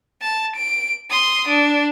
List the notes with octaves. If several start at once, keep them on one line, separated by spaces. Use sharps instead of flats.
A5
D7
C6 D#6
D4